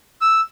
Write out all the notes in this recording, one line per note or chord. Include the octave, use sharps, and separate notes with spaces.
E6